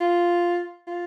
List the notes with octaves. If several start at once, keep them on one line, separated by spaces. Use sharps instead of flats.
F4
F4